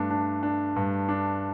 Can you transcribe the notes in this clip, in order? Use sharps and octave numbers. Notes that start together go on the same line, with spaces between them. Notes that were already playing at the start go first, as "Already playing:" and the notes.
Already playing: G2 A3 D4
D4
D4
G2
D4